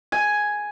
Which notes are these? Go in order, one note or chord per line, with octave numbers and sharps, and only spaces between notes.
G#5